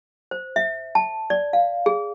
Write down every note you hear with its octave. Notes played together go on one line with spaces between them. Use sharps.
C5
E5
A5
D5
F5
G#4